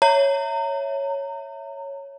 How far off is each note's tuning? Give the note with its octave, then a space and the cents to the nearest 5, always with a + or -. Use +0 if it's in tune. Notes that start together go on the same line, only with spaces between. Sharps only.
C#5 +0 E5 +0 A#5 -30